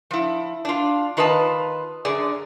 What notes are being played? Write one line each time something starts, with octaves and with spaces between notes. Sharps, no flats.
F3 E4
D4 F4
D#3 F4 B4 D#5 E5 A5
F#2 D3 G#4 D5